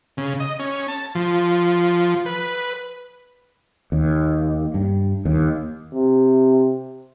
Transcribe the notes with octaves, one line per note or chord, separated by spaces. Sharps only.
C#3
D#5
C#4
A5
F3
B4
D#2
G2
D#2
C3